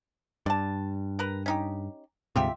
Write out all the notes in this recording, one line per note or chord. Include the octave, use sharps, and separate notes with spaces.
G2 D5 A5
A#4 B4 A#5
C#4 D#4 G4
D2 G#2 C3 F4 G4 E5